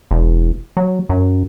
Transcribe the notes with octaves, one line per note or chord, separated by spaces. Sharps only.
E1
F#3
F#2